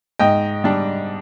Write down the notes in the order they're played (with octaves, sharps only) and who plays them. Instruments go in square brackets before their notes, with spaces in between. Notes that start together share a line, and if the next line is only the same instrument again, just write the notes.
[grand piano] G#2 D#5 G5
G3 D4